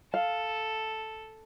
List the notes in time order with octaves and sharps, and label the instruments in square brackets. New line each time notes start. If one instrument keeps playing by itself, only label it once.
[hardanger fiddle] A4 [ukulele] F5